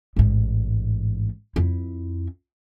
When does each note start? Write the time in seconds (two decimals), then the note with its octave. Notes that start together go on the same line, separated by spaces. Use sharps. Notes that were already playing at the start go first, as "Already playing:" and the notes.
0.16 A1 G#2
1.56 F2 E4